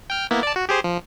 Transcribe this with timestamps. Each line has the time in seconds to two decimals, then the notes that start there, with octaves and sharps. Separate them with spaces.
0.10 G5 F6
0.31 A#3 B3 E4
0.43 D5 A5
0.56 F#4
0.69 G4 G#4 C5
0.84 F3